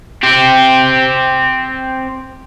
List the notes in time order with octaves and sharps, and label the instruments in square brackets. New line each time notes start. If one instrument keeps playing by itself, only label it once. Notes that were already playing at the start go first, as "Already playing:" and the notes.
[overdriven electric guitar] C4 G4